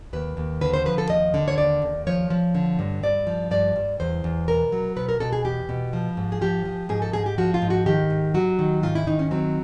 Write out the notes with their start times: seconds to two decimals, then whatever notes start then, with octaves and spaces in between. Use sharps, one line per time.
0.13 D#2 B4
0.37 D#2
0.61 D3 B4
0.74 C5
0.86 F3 B4
0.98 A4
1.09 D#2 D#5
1.34 D3
1.48 C#5
1.58 D#2 D5
1.82 D#2
2.07 F3 C#5
2.30 F3
2.55 D3
2.79 G2
3.03 G2 D5
3.27 F3
3.51 G2 D5
3.76 G2
4.00 E2 C5
4.24 E2
4.48 B2 A#4
4.72 F#3
4.96 B2 B4
5.09 A#4
5.20 B2 A4
5.33 G#4
5.45 E2 G4
5.69 B2
5.93 F3
6.17 G#2
6.32 G#4
6.41 F3 G4
6.65 F3
6.89 G#2 G#4
7.02 A4
7.13 G#2 G#4
7.26 G4
7.38 F3 F#4
7.54 F4
7.62 G#2
7.70 F#4
7.86 D#3 G4
8.10 G#2
8.34 F#3 F#4
8.59 D#3
8.83 G#2 F4
8.95 E4
9.07 D#3 D#4
9.19 C#4
9.31 F#3 C4